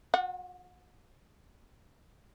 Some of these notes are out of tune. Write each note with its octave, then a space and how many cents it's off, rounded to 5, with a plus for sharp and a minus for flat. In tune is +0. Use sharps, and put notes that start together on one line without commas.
F#4 -45 F#5 +0